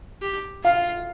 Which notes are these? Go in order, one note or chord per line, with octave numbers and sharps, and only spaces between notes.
G4
F4 F5